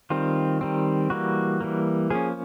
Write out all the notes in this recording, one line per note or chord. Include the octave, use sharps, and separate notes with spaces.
D#3 G3 C4 F4
D#3 G3 C4
E3 G3 A#3 F#4
E3 G3 A#3
F3 A#3 C#4 G#4